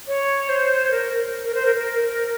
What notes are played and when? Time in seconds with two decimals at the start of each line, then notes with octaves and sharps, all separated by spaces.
0.08 C#5
0.49 C5
0.91 A#4
1.44 A#4
1.55 C5
1.65 A#4
1.76 A#4